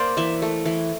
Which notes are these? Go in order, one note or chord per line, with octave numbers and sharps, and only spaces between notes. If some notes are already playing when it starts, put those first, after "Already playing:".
Already playing: A#3 C5 D5
E3 E5
A3
E3